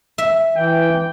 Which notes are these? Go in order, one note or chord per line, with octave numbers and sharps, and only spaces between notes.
E5
E3 G5